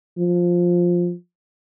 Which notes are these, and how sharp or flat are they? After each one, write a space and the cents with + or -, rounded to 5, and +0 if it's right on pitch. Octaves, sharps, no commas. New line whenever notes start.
F3 +5